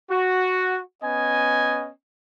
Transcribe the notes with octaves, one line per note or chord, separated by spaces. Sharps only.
F#4
B3 C#4 D#5 G#5